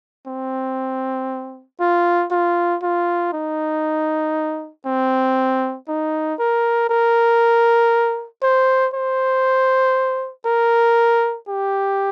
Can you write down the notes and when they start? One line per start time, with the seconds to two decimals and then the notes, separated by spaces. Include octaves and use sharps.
0.27 C4
1.80 F4
2.31 F4
2.82 F4
3.33 D#4
4.86 C4
5.88 D#4
6.39 A#4
6.90 A#4
8.43 C5
8.94 C5
10.46 A#4
11.48 G4